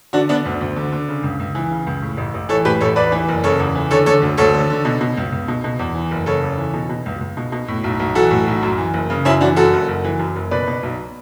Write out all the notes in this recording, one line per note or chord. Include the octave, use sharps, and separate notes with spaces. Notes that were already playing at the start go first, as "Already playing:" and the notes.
D3 D4 F#4
D3 B3 D4
D2
D2
D3
D3
C#3
C#2
C#2
E3
C#3
C#2
A2
A1
A1
E3 A4 C#5
A2 G4 B4
A1 A4 C#5
E2 B4 D5
E3
F#1
C#3 A4 C#5
E2
E3
D3 A4 C#5
D3 A4 C#5
D2
D2 A4 C#5
D3
D3
B2
B2
C#2
C#2
B2
B2
E2
E3
F#1
C#3 A4 C#5
E2
E3
B2
B2
C#2
C#2
B2
B2
A2
B1
B1
E3 F#4 A4
A2
B1
F#2
E3
F#1
C#3
F#2 C#4 E4
E3 D4 F#4
F#2 F#4 A4
F#1
F#1
E3
F#2
F#1
B2 B4 D5
B2
B1